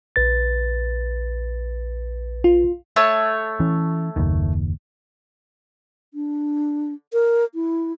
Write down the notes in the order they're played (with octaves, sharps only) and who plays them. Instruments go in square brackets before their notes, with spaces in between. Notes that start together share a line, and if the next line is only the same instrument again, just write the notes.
[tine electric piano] A#1 B4 A6
[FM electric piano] F4
[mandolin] A3 C#5 A5
[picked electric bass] E3 C#4
F#1 D#2 D#3
[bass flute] D4
A#4
E4